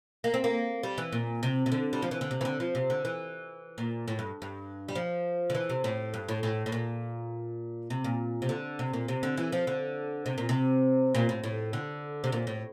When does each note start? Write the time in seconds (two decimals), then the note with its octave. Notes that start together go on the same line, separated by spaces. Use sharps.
0.24 A#3
0.34 C4
0.44 A#3
0.83 G3
0.98 E3
1.12 A#2
1.43 C3
1.66 C3
1.72 D3
1.93 G3
2.02 F3
2.11 E3
2.21 D3
2.31 C3
2.41 E3
2.45 D3
2.60 F3
2.75 C3
2.90 D3
3.05 E3
3.78 A#2
4.08 A2
4.19 G2
4.42 G2
4.88 G3
4.95 F3
5.50 D3
5.55 E3
5.70 C3
5.84 A2
6.14 G2
6.29 A2
6.43 A2
6.66 A2
6.72 A#2
7.90 C3
8.04 A#2
8.42 C3
8.49 D3
8.79 C3
8.94 A#2
9.08 C3
9.23 D3
9.37 E3
9.52 F3
9.67 D3
10.26 C3
10.38 A#2
10.49 C3
11.15 A#2
11.29 A2
11.44 A2
11.73 D3
12.24 C3
12.32 A#2
12.47 A2